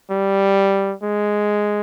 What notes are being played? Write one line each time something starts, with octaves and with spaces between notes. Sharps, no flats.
G3
G#3